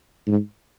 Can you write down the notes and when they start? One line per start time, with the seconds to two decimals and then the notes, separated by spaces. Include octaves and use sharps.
0.27 G#2